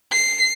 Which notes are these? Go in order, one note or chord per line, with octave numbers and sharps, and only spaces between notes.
C7